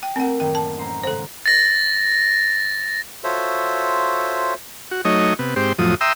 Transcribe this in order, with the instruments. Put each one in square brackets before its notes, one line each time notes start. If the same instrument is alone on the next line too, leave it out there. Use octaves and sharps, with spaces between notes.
[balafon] G5
[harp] A3 A#3 A#4 [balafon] C4 F#5
[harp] A1 F#2 D#3 [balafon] G5
[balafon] A5
[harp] A1 C5 A#5
[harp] G#2 C#3 G#3 [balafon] A4 C5
[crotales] A6 A#6
[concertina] F4 F#4 A4 C5 C#5 E5
[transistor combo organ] F#4
F#3 A3 D#4 C#5 D#5
C3 B3
G#2 C4 G4 C5
F2 A2 F3 F#3 D#6
E5 G5 A#5 C6 D#6 E6